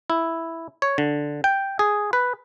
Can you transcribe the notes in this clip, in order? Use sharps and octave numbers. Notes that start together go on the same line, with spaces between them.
E4
C#5
D3
G5
G#4
B4